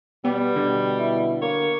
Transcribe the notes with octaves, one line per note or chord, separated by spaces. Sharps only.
B2 G3 B3 G4
B2 D3
E4
A#3 C#5